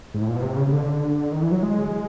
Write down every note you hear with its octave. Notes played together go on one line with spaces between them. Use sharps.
G#2
A2
A#2
B2
C3
C#3
C#3
D3
D#3
E3
F#3
G#3